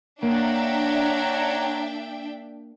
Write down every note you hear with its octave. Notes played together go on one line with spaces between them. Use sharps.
A#3 D4 C#5 E5 F#5 G5 A#5